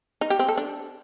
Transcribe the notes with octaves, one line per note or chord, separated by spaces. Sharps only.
D#4
G4
C4
A4
D4